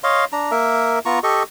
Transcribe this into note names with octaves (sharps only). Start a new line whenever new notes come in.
C#5 D#5 F5 C6
D4 A#5
A#3 A#4 E5
B3 F4 A#5 C#6
G4 A4 D#5 C#6